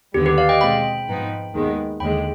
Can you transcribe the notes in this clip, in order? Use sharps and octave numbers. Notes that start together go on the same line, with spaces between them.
D#2 D3 G3 B3 G4
G4 B4
D5 F5
D#5 G5
B2 G#3 C4 G5 B5
G#2 F3 B3 D#4
D#2 D#3 G#3 B3
D#2 D3 G#3 G5 B5